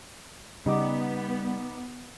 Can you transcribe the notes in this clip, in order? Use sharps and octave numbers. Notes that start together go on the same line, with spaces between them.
C#3 G3 B3 D#4 D6